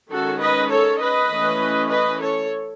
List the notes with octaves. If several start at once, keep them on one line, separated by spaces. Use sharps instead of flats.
D#3 G#3 C#4 F#4 A4
B4 D#5
A4 C#5
B4 D#5
E3 A3 C#4
B4 D#5
A4 C#5